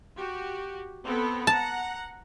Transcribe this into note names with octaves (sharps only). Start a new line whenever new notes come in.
F#4 G4
B3 C4 A4
F#5 A5 A#5